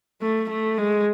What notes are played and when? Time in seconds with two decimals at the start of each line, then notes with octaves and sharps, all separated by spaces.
0.22 A3
0.50 A3
0.78 G#3